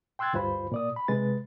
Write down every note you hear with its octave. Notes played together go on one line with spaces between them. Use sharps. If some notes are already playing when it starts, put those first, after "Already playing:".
G5 C6 E6 F#6 G#6 A6
D2 G2 F4 C5 B5
A#2 D5 D#6
B5
C3 G#3 B4 A6